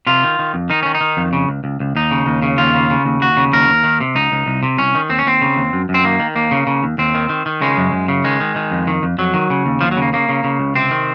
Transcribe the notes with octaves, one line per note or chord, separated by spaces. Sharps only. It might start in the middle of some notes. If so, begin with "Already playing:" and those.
C3 F4
D#3
D#3
F2
D#3 D#4
D#3 C#4
D#4
D#3
F2
C#3
C#2
C#2
C#2
D#2 D#4
C#3
D#2
C#3
D#2 F4
C#3
C#3
D#2
D#2 F#4
C#3
D#2 A#4
D#2
D#3
C3
C#2 D#4
C#2
C2
C3
C2 C#4
D#3
D#2 C4
C#4
D#2 C4
C#3
D#2
F#2
F#2
C4
D#3 A#3
D#3
D#2 A#3
C#3
C#3
D#2
D#2 C4
D#3
D#3
D#3
C#3 G#3
F#2
F#2
C#3
D#3 G#3
D#3
D#3
F2
D#3
F2
F2 F#3
D#3
C#3
D#2
D#2 F3
F#3
C#3 A#3
C#3 A#3
C#3
C#3
C#2
C3 C4
D#3